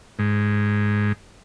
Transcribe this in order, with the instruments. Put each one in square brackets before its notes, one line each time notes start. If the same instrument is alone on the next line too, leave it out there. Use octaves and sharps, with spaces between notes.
[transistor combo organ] G#2